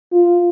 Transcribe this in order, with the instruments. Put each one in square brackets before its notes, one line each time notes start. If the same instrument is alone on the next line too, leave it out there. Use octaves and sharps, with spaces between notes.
[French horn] F4